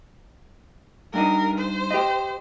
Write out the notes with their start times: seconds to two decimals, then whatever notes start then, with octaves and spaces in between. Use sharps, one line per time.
1.14 G2 D4 D#4 A#4
1.58 C5
1.91 G4 D#5